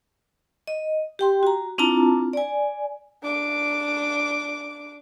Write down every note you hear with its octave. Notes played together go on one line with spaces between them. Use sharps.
D#5
G4 G5 C6
F#4 A#5
C4 D4 E4 F4 A5 A#5
D5 G#5
D4 D6